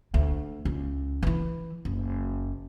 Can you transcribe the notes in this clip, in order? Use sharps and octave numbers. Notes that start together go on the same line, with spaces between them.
D2
C#2
E3 E4
F#1